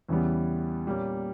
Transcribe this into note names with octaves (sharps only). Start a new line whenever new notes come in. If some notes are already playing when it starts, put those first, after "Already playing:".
E2 C#3 E3 G3 B3
A#2 G3 A#3 C#4